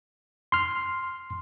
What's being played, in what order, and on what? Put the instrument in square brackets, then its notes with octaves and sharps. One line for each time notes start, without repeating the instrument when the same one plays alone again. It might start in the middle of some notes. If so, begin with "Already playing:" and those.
[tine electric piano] C6 F6